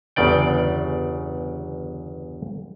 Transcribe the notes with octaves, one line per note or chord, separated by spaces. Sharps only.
G1 E2 C#3 D5 G5